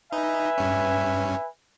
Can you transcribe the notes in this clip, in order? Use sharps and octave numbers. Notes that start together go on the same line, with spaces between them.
D#4 B4 E5 G#5
G2 C#4